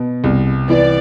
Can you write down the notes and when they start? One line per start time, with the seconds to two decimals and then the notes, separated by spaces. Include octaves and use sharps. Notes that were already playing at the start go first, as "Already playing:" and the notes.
Already playing: B2
0.24 C2
0.69 E3 D5